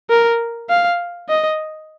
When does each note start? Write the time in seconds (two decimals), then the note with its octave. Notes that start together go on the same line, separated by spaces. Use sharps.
0.10 A#4
0.69 F5
1.29 D#5